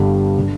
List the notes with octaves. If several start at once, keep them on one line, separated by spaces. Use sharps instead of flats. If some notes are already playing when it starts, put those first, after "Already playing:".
Already playing: G1 G2 D3 G3
D3